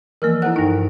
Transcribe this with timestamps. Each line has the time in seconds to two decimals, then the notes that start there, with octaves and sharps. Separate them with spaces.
0.22 E3 F3 A#3 A#4
0.42 E4 A4 C5 F#5 F#6
0.56 G2 D#4